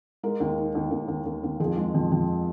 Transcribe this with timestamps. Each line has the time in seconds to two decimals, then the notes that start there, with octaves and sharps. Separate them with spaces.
0.23 G#3 A#4
0.40 D#2
0.58 D#3
0.75 D#2
0.91 D#2
1.08 D#2
1.26 D#2
1.43 D#2
1.60 F2 G#4
1.77 G#3
1.95 F2
2.12 F2